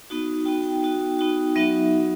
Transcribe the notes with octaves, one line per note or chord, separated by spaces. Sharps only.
B3 D#4 F#4
B3 D#4 F#4 G5
G5
B3 D#4 F#4
B3 D#4 F#4
F#3 B3 D#4 F#4 E5